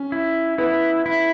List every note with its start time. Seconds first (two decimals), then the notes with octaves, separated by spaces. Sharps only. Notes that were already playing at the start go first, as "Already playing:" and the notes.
Already playing: C#4
0.12 E4
0.58 B3 E4
1.06 E4